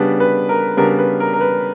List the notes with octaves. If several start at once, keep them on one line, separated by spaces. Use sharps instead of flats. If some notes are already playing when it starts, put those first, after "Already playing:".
Already playing: C#3 G3 B3 D4
B4
A#4
C#3 G3 B3 D4 A#4
B4
A#4
A#4
B4